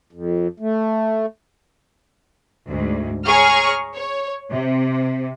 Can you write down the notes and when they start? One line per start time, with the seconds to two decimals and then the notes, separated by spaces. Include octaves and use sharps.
0.13 F2
0.60 A3
2.68 D2 G#2
3.26 G#4 C#5 A#5 C#6 F6
3.95 C#5
4.50 C3